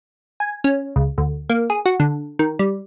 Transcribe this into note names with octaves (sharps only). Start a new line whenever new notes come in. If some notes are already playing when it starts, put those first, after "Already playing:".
G#5
C#4
C#2
D2
A#3
G#4
F#4
D3
D#3
G3